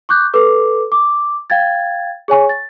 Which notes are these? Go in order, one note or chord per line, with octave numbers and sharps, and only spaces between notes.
C#6 D6 F#6 G6
A4 B4 D6
D6
F5 G5 G#6 A6
G#4 C#5 G#5 C#6
A6